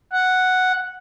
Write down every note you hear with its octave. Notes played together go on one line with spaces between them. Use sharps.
F#5